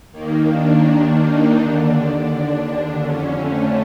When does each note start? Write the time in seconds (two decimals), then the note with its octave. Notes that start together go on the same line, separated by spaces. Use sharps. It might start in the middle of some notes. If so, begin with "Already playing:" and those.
0.12 D#2 D#3 A#3
0.48 D4
0.84 D4
1.20 D#4
1.56 D#2 D3 D4
3.01 F2 D3 C#4
3.37 A3